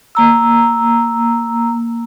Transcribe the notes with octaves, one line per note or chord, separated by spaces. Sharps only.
A#3 A#5 E6